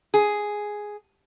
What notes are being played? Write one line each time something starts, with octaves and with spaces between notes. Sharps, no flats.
G#4